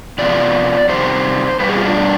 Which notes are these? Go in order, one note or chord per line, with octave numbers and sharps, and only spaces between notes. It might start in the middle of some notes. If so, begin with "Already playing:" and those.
C3 F3 B3 D5
C3 D#3 G3 C5
B2 G3 B3 B4
G#4
F4
D4